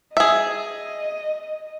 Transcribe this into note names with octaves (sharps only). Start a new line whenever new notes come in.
G#4 D#5 E5